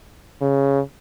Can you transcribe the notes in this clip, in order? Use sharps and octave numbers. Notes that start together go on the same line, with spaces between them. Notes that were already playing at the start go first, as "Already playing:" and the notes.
C#3